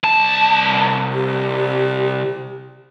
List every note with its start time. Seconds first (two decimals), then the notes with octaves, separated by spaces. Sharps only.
0.03 C2 A5
1.13 G4